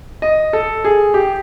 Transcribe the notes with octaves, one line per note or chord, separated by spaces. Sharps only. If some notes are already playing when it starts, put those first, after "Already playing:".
D#5
A4
G#4
G4